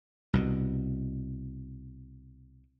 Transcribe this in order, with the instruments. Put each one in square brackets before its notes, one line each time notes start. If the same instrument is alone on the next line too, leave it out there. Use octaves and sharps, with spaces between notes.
[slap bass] C2 B2